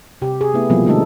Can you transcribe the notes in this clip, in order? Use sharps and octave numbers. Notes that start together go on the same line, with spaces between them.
C3 G4
G#4
A3 B3 E4
B2 E3 F3 G3 A#3 C4
D3 G#3 A3 D#4 A4